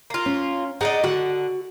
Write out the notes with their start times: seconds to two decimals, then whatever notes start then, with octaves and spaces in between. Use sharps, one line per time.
0.10 A#3 F4
0.26 C#4
0.81 D#4 G#4 D5 D#5 F#5 A#5
1.03 D3 F#4 F#5